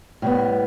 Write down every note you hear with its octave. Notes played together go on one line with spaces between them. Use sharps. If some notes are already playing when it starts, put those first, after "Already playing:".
A2 G3 B3